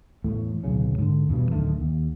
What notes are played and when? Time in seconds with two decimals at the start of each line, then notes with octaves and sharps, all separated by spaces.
0.24 E2 A2 A3
0.64 D1 B1 C#3 C#4
0.98 G#2 D3
1.29 E2 G2 B2
1.51 D1 D3 D#3 A3
1.80 D#2